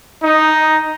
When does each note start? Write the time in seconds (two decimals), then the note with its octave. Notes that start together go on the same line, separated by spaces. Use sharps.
0.23 D#4